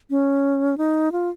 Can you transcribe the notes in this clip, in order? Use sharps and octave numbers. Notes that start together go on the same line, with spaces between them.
C#4
D#4
F4